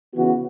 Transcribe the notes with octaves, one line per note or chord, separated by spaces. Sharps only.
C#3 E3 B3 F#4